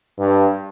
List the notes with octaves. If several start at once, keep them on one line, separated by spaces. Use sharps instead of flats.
G2